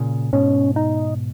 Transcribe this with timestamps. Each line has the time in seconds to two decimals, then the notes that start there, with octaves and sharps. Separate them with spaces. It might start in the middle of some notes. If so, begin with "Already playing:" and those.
Already playing: A#2 C#3
0.33 G#2 B2 C#4
0.76 D#4